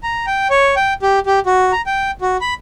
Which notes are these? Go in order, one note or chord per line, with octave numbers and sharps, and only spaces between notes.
A#5
G5
C#5
G5
G4
G4
F#4
A#5
G5
F#4
B5